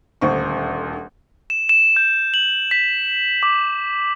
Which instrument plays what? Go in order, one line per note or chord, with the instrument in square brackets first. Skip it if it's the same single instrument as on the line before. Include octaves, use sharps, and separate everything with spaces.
[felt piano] D#1 D2 C5 C#6
[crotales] E7
E7
G6
F#7
B6
D6